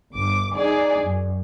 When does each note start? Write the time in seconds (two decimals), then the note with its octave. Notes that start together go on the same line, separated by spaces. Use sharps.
0.12 G1 D6
0.55 D#4 G#4 D5
1.00 F#2